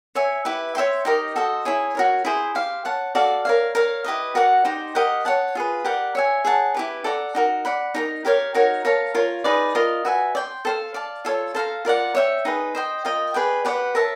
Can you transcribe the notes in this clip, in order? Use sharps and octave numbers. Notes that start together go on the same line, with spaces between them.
C#5 E5 G#5
E4 G4 B4 E5
C#5 E5 G5 C6
D#4 G4 A#4 D#5
F#4 A4 C5 D#5
E4 G#4 C#5
F#4 A#4 C#5
E4 G#4 C5
G4 C5 F5
C#5 F#5 A5
F#4 A4 D5 F5
A#4 C#5 F5
A#4 C#5 F5
E4 G4 B4 D#5
F#4 A#4 D5 F#5
D#4 G4 C5
G4 A#4 D#5 F#5
C#5 F#5 A5
F4 G#4 B4
G4 A#4 D5 F#5
C#5 E5 G#5
G#4 C#5 F#5 A5
E4 G4 B4
A4 D5 F#5 A#5
D#4 F#4 A#4
D5 F#5 B5
D#4 G4 A#4
G4 A#4 C#5 F5
D#4 F#4 A#4 C#5
A#4 C#5 F5 A5
F4 A#4 C#5
D#4 G#4 B4 D5
F4 A#4 D#5
F#4 B4 E5 G#5
D5 G5 C6
A4 C5 F5
D5 F5 A5
F4 A4 C#5
A4 C5 F5 A#5
F4 A#4 D5 F#5
C#5 E5 G5
D#4 G#4 B4
C5 D#5 G5
F4 A#4 D#5 G5
G#4 B4 D5 G5
G4 B4 D5 F#5
A#4 C#5 E5 A5